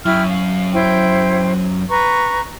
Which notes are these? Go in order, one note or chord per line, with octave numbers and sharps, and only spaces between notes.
F#2 E4 G5 F6
F5
E4 C5 G5
B4 A#5 C#6